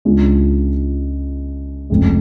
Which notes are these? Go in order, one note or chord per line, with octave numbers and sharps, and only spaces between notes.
C#2 C#3 G#3 D4 F4
F1 F2 C#3 G#3